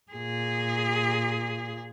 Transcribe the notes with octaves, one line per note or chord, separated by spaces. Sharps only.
A#2 G#4